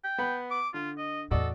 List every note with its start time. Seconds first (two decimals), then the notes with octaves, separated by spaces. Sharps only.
0.04 G5
0.18 B3 B5
0.51 D6
0.74 D3 F4
0.98 D#5
1.31 E2 A2 F#4 A4 D5 D#5